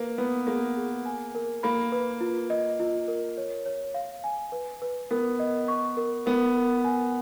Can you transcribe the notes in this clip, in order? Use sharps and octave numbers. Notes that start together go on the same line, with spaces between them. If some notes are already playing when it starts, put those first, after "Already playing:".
Already playing: A#3 B4
B3 B4
A#3 G#4
G#4
G#5
A#4
A#3 B5
B4
F4
D#5
F4
A#4
C#5
C#5
F5
G#5
B4
B4
B3 A#4
D#5
C#6
A#4
B3 A#4
A#4
G#5